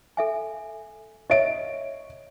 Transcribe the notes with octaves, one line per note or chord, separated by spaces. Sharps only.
A4 E5 G#5
C#5 D#5 E5 D7